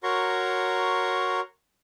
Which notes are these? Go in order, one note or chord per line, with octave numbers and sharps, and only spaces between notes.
F#4 A#4 C#5 A#5 C6 C#6